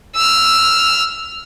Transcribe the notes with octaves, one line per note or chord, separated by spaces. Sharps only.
E6 F6